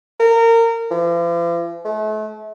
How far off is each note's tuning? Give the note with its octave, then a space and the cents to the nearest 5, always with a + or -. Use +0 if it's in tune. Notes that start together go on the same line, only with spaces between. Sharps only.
A#4 -25
F3 -45
A3 -40